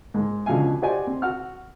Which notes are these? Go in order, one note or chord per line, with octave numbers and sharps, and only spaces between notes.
G#2 G#3
C#2 B2 D3 F3 F5 G#5
F#4 G4 C5 D5 D#5 G#5
C4
F#4 F#5 F6